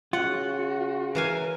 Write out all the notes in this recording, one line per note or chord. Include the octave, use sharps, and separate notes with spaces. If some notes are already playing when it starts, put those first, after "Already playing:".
C#3 F4 F#4 F#5
E3 A#4 F5 G#5